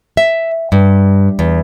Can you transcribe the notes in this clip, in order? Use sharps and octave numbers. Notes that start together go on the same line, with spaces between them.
E5
G2
E2